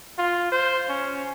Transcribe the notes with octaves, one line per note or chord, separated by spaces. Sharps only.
F4
C5
C#4